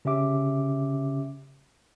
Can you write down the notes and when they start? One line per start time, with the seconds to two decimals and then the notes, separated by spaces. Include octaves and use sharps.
0.05 C#3 C#4 G4 E5 D6